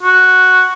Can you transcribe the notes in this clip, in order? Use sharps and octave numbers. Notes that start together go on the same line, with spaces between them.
F#4